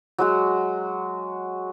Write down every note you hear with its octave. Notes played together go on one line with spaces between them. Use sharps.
F#3 G#3 F#4